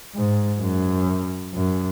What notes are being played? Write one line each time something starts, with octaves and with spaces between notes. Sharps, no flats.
G#2
F#2
F#2